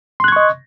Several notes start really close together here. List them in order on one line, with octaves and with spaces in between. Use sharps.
C6 F#6 G#6 C#6 D#5